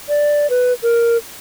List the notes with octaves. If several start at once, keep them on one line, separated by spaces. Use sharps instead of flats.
D5
B4
A#4